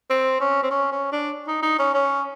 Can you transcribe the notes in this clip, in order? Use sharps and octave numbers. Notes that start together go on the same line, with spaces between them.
C4
C#4
C4
C#4
C#4
D4
D#4
D#4
C#4
C#4